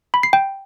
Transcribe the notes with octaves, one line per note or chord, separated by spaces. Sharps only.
B5
C7
G5